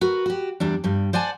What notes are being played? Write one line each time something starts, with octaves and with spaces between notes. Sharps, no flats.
F#4 A#4 B4
F#4 G4
E2 G3 D4
G2 G3
C5 D5 F#5 G#5 A5